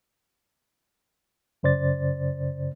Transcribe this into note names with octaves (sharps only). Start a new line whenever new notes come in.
F#2 C#3 C5 D5 A6